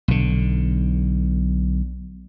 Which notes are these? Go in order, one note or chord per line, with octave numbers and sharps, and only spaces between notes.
B1 D3